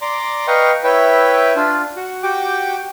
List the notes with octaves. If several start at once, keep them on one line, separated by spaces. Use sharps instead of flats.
D5 A#5 C6 D6
B4 D#5 F5 G5 A#5 C#6
E4 B4 C#5 E5 G5
D4 F4
F#4
F#4 G4 G5 D6